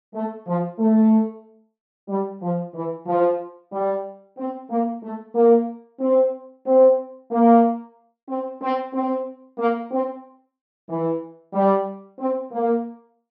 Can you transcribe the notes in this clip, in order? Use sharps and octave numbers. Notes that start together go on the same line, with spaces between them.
A3
F3
A3
G3
F3
E3
F3
G3
C4
A#3
A3
A#3
C4
C4
A#3
C4
C4
C4
A#3
C4
E3
G3
C4
A#3